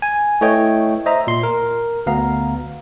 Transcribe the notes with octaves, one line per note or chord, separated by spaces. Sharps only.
G#5
A3 E4 B4 C#5 D#5 G5
C5 D#5 E5 A#5
A#2 C6
A#4
D2 B3 F5 A#5